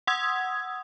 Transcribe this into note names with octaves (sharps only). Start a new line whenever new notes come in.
F#5 C6 D#6 E6 G#6